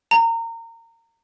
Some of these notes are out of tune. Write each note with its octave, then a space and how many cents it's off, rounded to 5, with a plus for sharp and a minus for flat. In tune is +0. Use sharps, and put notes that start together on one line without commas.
A#5 -25